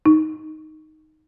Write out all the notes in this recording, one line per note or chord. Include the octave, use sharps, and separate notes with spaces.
D#4